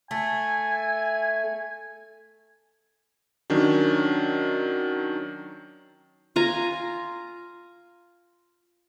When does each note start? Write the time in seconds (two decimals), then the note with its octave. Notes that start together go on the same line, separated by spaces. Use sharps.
0.11 A3 G#5
3.50 D#3 F#3 C#4 D4
6.36 F4 G#5 A#5